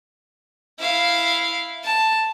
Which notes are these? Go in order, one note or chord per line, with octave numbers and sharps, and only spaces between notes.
E4 F5
A5